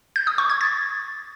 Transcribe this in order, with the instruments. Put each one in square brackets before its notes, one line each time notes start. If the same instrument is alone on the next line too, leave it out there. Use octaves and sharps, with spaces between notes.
[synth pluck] G6
D#6
C#6
G#6
A6